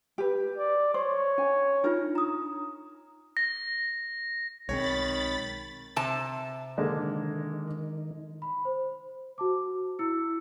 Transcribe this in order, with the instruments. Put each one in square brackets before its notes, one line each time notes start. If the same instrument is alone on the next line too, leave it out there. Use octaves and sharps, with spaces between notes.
[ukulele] G4 B4
[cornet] D5
[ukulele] C5 [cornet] C#5 [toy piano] C6 C#6
[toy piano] C#4 [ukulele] G#5
[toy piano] D4 D#4 F4 [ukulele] A#4
[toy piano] A#5 D#6
[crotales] A#6
[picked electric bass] B1 G#3 C4 [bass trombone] D#3 [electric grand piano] C#5 [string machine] B5 A6
[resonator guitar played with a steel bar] C3 A5
[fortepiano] D3 G#3 A#3 [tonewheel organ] D#3
[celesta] B5
C5
F#4 A5 D6
E4 E6 C#7